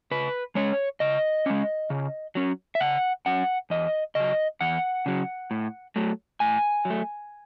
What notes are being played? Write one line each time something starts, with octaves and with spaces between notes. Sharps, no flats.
C#3 B4
G#3 C#4 C#5
C#3 D#5
G#3 C#4
C#3
F#3 C#4
E5
C#3 F#5
F#3 C#4 F#5
E2 D#5
C#3 F#3 D#5
E2 F#5
C#3 F#3
A2
F#3 A3
A2 G#5
F#3
A3